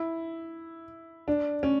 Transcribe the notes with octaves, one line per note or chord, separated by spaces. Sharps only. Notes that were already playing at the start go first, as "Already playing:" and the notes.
Already playing: E4
D4
C#4